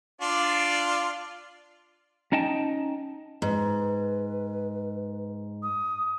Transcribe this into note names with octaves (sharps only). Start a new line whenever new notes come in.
D4 F4 D5
C#4 D#4 D#5 G5 A5
G#2 B4
D#6